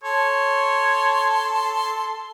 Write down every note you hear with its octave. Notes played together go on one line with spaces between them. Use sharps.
A4 C#5 C6